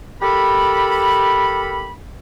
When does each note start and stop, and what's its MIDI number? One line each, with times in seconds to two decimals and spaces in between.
0.21 1.92 67
0.21 1.92 69
0.21 1.92 70
0.21 1.92 83